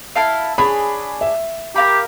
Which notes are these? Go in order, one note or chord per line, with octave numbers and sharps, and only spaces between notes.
E4 A4 F5
D4 G#4 C#5 B5
E5
G4 A#4 F5 B5